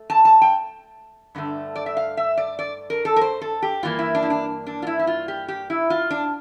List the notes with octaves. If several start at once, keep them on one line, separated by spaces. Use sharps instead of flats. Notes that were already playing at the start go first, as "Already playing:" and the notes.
Already playing: A3
A5
A5
G5
G2 D3 A3
D5
E5
F5
E5
D5
D5
A#4
A4
A#4
C5
A4
G4
G2 E3 A#3 F4
E4
D4
E4
D4
D4
F4
E4
E4
F4
G4
G4
E4
F4
D4